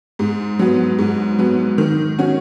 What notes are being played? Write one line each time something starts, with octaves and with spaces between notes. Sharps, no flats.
G#2
F#3 B3
G#2
F#3 B3
D#3
F#3 C#4 F#4